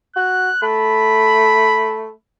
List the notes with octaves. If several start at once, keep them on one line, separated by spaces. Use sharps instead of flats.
F#4 F#6
A3 B5